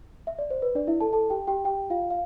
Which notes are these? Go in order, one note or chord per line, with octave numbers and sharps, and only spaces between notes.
E5
D5
C5
B4
D4 D5
E4 E5
A4 A5
A4 A5
G4 G5
G4 G5
G4 G5
F4 F5
F5